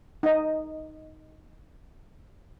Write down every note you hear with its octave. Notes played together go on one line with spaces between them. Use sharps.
D#4 D#5